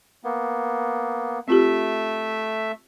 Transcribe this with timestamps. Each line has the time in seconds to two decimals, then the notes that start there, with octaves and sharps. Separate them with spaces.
0.24 A#3 B3
1.48 A3 C4 F4 G4 E5